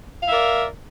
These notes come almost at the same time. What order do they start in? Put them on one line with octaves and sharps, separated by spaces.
F5 E5 A#4 D5